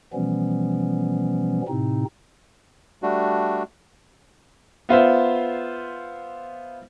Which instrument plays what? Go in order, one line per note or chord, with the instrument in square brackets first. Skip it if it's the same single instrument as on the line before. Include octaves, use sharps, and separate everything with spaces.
[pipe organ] B2 E3 F3 G3 B3 C#4
A2 C3 C4 D#4
[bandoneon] G3 A3 D4 F#4
[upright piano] B3 F4 C5 E5